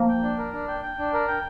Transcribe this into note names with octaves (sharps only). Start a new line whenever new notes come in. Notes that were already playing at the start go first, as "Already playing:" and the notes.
Already playing: F3 A#3
G5
D4
A#4
D4
G5
G5
D4
A#4
G5